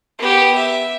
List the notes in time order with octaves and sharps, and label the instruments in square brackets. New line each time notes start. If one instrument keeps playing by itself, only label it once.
[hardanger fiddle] B3 G4
E5